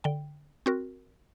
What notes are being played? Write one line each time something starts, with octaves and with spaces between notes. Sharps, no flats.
D3 G5
C4 F#4 A#4